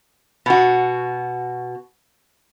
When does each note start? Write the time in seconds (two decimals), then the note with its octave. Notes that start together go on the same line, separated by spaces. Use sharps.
0.46 B2 F#4